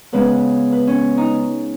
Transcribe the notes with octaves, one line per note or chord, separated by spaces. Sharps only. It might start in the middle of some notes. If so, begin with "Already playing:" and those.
C#3 G#3 B3 B4
B4
C#4
D#4